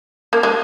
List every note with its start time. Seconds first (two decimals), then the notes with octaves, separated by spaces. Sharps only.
0.33 A#3
0.43 G#3